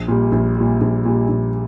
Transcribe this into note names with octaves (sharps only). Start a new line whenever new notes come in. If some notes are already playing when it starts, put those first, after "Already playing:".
Already playing: A#1
A#2 G3
A#1
A#2 G3
A#1
A#2 G3
A#1